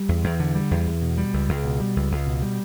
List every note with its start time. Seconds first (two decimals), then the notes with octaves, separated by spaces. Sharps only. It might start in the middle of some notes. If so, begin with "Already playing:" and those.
Already playing: G3
0.09 E2
0.24 E2
0.40 D3
0.55 G3
0.71 E2
0.87 E2
1.02 B2
1.18 G3
1.34 C#2
1.49 C#2
1.64 B2
1.80 G3
1.96 C#2
2.11 C#2
2.27 B2
2.42 G3